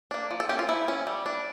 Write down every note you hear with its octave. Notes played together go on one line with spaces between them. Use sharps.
A#3 D4
F3
A4
A#3 C#4 G4
F4
F3 E4
C#4
G3
D4